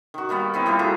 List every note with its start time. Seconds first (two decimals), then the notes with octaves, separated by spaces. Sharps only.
0.14 D#3 F#4
0.29 D#3 G3 A#3 B3
0.54 B3 C4 D#4 E4
0.66 G3 A#3 E4 F4
0.79 A3 F#4 G#4 A#5